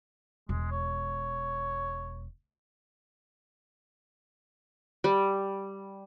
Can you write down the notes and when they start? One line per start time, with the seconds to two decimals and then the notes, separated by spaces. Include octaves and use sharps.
0.49 E1 G#3
0.71 C#5
5.04 G3